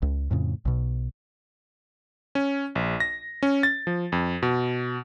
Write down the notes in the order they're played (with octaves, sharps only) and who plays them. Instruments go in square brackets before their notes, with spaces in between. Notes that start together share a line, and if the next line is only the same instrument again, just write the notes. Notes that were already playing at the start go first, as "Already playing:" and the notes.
[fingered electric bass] C#2
F2 A2 C#3
B1 B2
[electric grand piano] C#4
A#1
A#6
C#4
A6
F3
F2
B2